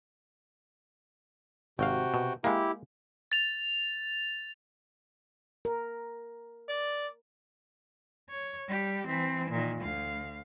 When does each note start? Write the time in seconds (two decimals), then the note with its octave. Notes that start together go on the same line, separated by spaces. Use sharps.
1.79 G#1 C3 F#4 F5 G5
2.14 B2
2.44 G#3 A#3 E4 G4
3.32 A6 F7
5.65 A#4
6.69 D5
8.30 C#5
8.68 G3 G4
9.08 E3 C4
9.51 A#2 D#3
9.81 D2 F5